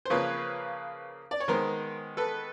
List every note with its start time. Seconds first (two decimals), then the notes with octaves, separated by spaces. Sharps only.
0.05 C5
0.10 C#3 F3 A#3 B4 C#5
1.31 D5
1.40 C#5
1.48 D#3 G#3 B3 A#4 C5
2.17 A4 B4